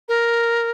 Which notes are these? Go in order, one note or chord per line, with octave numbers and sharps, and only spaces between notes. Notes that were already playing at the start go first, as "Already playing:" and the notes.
A#4